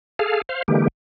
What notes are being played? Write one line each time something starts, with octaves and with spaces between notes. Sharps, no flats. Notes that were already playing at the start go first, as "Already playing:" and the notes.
G#4 A4 F5
C5 F5
D3 E3 G#3 A#3 G4